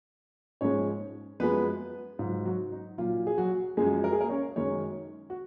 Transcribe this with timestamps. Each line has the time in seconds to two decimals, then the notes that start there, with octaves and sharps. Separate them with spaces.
0.61 G#2 F3 G#3 C#4 C#5
1.40 F#2 F3 G#3 B3 B4
2.19 G#2 F#3 F4
2.45 F#3 F#4
2.72 D#4
2.98 A#2 F#3 F4
3.27 G#4
3.38 F#3 F#4
3.77 F#2 F3 G#3 G#4
4.04 A#4
4.12 G#4
4.21 A#3 A#4
4.30 C#4 C#5
4.56 F#2 D#3 G#3 C#4 C#5
5.30 F#4